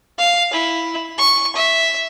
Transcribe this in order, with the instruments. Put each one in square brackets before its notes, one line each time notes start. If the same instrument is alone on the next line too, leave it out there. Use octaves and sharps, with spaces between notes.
[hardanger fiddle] F5
E4
C#6
E5